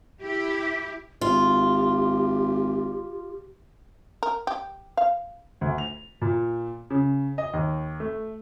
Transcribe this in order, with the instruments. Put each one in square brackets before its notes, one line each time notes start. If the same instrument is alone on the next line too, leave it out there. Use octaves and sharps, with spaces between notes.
[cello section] E4 G4
[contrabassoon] G#1 [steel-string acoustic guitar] F4 [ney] G4
[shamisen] A#4
G4
F5
[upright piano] D2
F7
A#2
C#3
D#5
D#2
A3